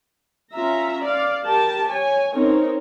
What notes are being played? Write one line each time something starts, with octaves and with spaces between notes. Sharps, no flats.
C#4 F4 E5 A#5
D5 F5
G4 A#4 G5 A5
C#5 G#5
C4 C#4 D#4 A#4 C#5